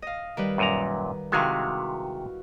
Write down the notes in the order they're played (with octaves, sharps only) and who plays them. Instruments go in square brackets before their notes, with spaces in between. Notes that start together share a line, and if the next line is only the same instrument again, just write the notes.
[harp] D#5 F5
D#3 G3 B4
[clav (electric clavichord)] F#2 A#2 A#5
[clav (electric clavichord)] C3 D#3 G#3 [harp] E4 F#4 F5